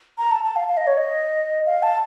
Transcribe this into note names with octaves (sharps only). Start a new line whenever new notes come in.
A#5
A5
A5
F5
F5
D#5
C#5
D#5
F5
A5